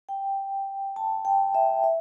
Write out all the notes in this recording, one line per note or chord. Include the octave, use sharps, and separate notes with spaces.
G5
A5
G5
E5
E5